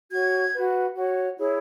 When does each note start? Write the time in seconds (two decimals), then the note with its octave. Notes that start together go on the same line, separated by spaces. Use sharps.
0.10 F#4 C#5 G#6
0.53 F#4 B4
0.95 F#4 C#5
1.38 E4 G#4 C#5